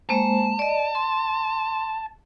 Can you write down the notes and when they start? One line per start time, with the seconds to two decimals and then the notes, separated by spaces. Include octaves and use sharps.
0.09 G#3 A#3 C5 A5
0.59 D5 D#5
0.95 C6